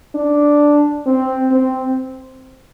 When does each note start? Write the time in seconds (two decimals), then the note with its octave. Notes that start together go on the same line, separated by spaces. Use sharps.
0.15 D4
1.06 C4
1.51 C4